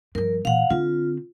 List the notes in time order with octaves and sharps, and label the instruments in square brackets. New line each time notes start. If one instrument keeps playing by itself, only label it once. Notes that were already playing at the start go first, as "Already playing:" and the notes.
[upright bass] G2 F3 [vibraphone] A#4
[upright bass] A#2 E3 [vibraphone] F5 F#5
[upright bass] D3 C4 [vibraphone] F4